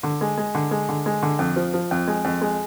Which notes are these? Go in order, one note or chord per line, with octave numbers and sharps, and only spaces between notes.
D3
G#3
G#3
D3
G#3
D3
G#3
D3
F2
F3
F3
F2
G#3
F2
G#3